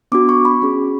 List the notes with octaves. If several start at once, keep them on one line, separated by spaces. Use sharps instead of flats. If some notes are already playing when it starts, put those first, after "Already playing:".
B3 D4 F#4 D6
C#6
B5
C#4 G#4